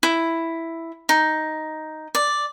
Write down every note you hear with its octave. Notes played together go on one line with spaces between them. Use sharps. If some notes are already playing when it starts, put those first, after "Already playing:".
E4
D#4
D5